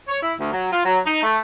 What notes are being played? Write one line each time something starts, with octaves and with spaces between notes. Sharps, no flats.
C#5
E4
D2
F#3
F4
F#3
D#4
A3